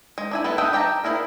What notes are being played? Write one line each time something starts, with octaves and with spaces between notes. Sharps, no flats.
G#3
D4 E4 G#5
B3 E4 A4 A5
A4 D#5 E5 F#5 G5
G4 G5 A5 A#5
A#3 D#4 E4 G#4 A#4